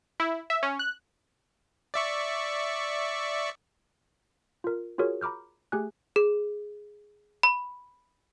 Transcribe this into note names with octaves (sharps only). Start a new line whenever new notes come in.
E4
E5
C#4
F#6
D5 E5 C#6
F4 A#4
F4 F#4 G#4 A#4 C#5
A#5 B5 D6 F6 G6
A3 G4 G#4 G#5 F#6
G#4
B5